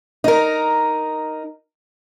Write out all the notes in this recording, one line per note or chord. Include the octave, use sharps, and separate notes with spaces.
D#4 A#4